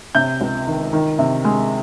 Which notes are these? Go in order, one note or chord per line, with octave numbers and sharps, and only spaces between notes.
C3 G6
C#2
D#3
D#3
C3
G#3